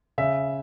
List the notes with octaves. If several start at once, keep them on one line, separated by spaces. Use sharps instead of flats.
C#3 E5